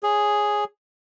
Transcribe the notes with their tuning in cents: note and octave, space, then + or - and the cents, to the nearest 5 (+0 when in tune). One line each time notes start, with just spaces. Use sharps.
G#4 +0 C#5 +0